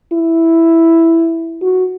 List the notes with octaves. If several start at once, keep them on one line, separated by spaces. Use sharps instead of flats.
E4
F#4